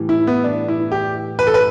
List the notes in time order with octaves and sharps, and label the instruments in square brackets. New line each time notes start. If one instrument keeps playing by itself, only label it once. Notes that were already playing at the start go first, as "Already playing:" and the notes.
Already playing: [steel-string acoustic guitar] A2 E3 G3
[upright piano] E4
B3
D4
E4
G4
B4
A4
B4